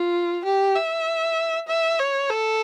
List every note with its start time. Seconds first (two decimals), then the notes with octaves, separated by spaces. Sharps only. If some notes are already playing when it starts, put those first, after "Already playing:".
Already playing: F4
0.44 G4
0.76 E5
1.68 E5
1.99 C#5
2.30 A4